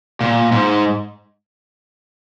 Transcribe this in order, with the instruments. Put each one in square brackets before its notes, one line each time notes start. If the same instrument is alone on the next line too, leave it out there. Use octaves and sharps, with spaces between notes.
[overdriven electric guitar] A#2
G#2